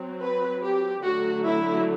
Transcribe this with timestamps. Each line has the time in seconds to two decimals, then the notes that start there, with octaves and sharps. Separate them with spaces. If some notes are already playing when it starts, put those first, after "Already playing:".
Already playing: F#3 C4
0.21 B4
0.62 G4
1.04 D3 F#3 A3 F#4
1.45 E4